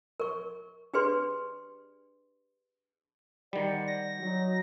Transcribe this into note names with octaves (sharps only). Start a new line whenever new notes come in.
A#4 C#6
D4 G4 G#4 B4 D5 C6
D#3 G3 C5 D5 F#5
A#6
F#3 D#4